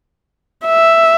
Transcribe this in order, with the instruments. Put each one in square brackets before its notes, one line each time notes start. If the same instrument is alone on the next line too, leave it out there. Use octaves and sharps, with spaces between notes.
[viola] E5